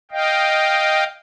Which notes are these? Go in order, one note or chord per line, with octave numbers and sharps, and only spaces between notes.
D#5 F5 G5